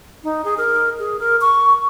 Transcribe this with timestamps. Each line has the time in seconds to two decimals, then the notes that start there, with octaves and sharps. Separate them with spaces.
0.23 D#4
0.44 G#4
0.57 A#4
0.99 G#4
1.19 A#4
1.41 C#6